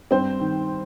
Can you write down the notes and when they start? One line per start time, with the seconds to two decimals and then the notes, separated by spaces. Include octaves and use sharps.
0.11 G2 C4 C5
0.40 D#3